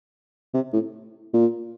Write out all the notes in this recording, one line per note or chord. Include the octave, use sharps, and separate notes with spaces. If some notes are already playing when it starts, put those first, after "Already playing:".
C3
A2
A#2